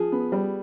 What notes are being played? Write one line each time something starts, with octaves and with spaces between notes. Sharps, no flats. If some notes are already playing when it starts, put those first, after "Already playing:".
Already playing: F3 G#4
B3
G3